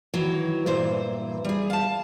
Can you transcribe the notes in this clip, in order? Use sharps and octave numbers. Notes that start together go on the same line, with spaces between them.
D#3 E3 F#3
G2 A#2 E3 C5
G3 G#4
F5 A5